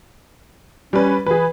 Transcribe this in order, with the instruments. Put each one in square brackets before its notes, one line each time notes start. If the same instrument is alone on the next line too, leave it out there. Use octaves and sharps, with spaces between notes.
[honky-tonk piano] G3 B4 [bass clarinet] C#4
[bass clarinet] E3 [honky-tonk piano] G#4 B4